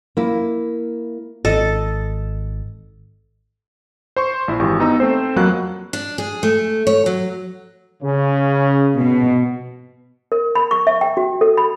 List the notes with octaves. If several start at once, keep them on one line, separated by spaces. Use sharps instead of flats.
A#3 E4
G#1 A4 D#5
C5 C6 C#6
A#1 E4
G#1 E3 G4 C#6
B3 D#4 A#5 E6
A3 C4 C5
F2 F#3 A#3 F#4 F#6
D4
G#4
A3
C#5
F#3
C#3
B2
A#4
B5
C#6
E5
G5
F#4
A4
B5